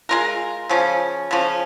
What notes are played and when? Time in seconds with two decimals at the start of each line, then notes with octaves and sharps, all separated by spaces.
0.09 G#3 F4 A#4
0.69 C#3 F3 C#4
1.31 C#3 F3 C#4